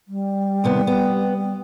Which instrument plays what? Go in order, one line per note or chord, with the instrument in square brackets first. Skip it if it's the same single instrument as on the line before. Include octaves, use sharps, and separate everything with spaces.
[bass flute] G3
[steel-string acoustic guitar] D#2 C3 B3
B3